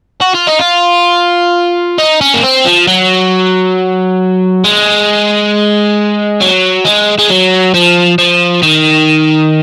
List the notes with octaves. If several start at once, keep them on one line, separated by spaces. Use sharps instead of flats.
F#4
F4
D#4
F4
D#4
C#4
A#3
C4
F3
F#3
G#3
F#3
G#3
G#3
F#3
F3
F3
D#3